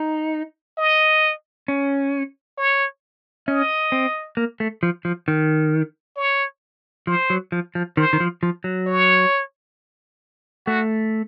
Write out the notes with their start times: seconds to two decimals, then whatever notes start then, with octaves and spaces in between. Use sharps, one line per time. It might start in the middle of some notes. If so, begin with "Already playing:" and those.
Already playing: D#4
0.78 D#5
1.68 C#4
2.58 C#5
3.48 C#4 D#5
3.92 C4
4.37 A#3
4.60 A3
4.83 F3
5.05 F3
5.28 D#3
6.17 C#5
7.07 F3 C5
7.30 F#3
7.52 F3
7.75 F3
7.97 D#3 C5
8.13 D#3
8.20 F3
8.43 F3
8.64 F#3
8.87 C#5
10.66 A3 F#4